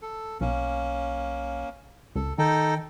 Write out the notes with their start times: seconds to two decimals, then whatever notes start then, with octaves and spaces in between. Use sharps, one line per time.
0.02 A4
0.41 B1 A#3 C#4
2.15 C#2 A4
2.38 D#3 D#4 A4 G5